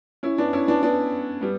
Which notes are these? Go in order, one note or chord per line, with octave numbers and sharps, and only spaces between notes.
C#4 E4
B3 D4
C#4 E4
B3 D4
B3 D4
G3 B3